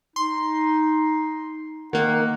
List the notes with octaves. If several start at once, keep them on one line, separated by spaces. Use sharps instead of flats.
D#4 C6
D#3 A#3 F#5